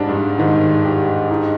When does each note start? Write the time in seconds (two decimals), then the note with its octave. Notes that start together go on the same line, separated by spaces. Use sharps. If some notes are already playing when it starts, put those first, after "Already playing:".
Already playing: G#2 G3 D4
0.09 G2
0.38 G#2 D#3
0.85 G4
1.30 D#4